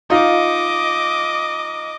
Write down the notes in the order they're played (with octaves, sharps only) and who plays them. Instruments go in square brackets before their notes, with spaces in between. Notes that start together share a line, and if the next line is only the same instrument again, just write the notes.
[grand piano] D#4 F4 [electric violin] D#5 D6